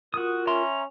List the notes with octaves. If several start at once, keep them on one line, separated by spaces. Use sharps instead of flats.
F4 F#4 A#4 D#6
C#4 E5 A#5 C6